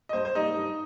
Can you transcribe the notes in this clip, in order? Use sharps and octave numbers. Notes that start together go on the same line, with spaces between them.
D#5
G2 C5
C5
G3 A#3 D#4 D#5
G2